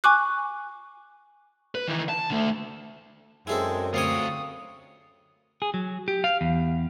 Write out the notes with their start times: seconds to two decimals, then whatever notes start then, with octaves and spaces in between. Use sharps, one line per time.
0.04 G#5 C#6 D6 F#6
1.75 B4
1.88 D#3 E3
2.09 A5
2.30 D3 A3
3.47 F#2 G#3 C4 E4 G#4 A4
3.94 D2 C4 F4 C#5 G#5 D#6
5.62 G#4
5.74 F#3
6.08 G4
6.24 F5
6.41 E2